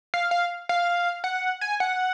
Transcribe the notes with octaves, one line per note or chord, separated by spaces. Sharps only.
F5
F5
F5
F#5
G#5
F#5